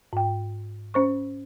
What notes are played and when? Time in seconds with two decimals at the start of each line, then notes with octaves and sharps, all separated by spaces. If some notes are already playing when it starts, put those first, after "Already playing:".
0.13 G#2 G5
0.94 C#4 C5 C#6